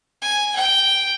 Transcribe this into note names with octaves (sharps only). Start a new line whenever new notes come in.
G#5
G5